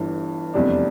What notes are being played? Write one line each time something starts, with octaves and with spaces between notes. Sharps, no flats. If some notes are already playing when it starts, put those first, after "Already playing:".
Already playing: G1 G2 E3
F1 E2 C3 G3 D4